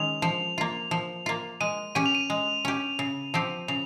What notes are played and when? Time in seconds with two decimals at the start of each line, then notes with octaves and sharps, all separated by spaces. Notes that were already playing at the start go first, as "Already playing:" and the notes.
Already playing: D#3 G#3 C#4 G#4 F7
0.22 F3
0.58 A#3 F4
0.91 F3
1.26 A#3 F4
1.61 G#3 D#7
1.95 C#4 G4 D#7
2.06 F7
2.15 D#7
2.30 G#3
2.65 C#4 G4
2.99 C#3
3.34 F3 C4 G4
3.68 C#3 F7